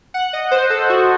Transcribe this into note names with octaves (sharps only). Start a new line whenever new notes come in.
F#5
D#5
C5
A4
F#4